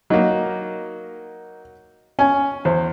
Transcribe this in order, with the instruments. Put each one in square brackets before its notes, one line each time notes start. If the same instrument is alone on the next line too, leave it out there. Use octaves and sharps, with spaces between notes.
[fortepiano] F#3 A#3 [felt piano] D#4
[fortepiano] C#4 [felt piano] G#5
[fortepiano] E2 [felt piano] C5